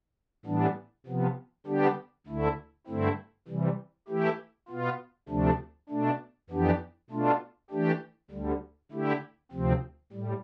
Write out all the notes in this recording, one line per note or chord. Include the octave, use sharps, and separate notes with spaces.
A2 E3 G3 B3 D4
C3 F3 B3
D3 G3 B3 D4 G4
D2 D3 A3 E4
G2 D3 A3 C4 E4
C3 E3 G3
E3 A3 E4 G4
B2 B3 F4
D2 C3 F3 A3 D4
B2 A3 D4
F2 E3 B3 D4 G4
B2 A3 D4 F4
E3 A3 D4 G4
D2 D3 G3
D3 A3 E4 G4
D2 C3 F3 C4
A2 G3